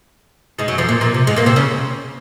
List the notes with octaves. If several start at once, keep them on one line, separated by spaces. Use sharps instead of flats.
G#2 G#3
F#2 F#3
F2 F3
A#2
A#2
C3
G#2 G#3
A#2 A#3
C3 C4
C#3 C#4